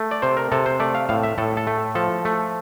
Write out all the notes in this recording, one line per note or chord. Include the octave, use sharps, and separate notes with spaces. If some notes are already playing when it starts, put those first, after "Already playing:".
Already playing: A3
D5
C3 C5
A#4
C3 A4
C5
A3 D5
F5
A2 F5
E5
A2 A4
A4
A3
F3 A4
A3